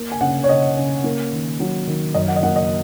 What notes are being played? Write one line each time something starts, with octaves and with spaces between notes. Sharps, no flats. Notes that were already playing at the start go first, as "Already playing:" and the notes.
Already playing: A#3
G#5
C#3 F#5
C#5
C#3 D#5
C#3
A#3
D#3
F#3
D#3
F#2 D#5
F#5
D#5
A#3 F#5
D#5